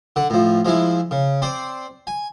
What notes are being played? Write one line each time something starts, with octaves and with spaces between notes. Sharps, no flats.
D3 F#5
A2 F3
F3 G#3 E4
C#3
C4 C5 D5
G#5